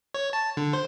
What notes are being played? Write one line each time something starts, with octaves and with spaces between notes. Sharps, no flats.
C#5
A5
D3
C5